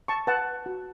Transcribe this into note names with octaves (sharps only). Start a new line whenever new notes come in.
A5 C#6
B4 F#5 A5
F#4